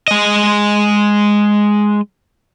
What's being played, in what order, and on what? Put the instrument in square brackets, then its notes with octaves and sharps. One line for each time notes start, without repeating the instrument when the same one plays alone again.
[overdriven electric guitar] G#3 D#5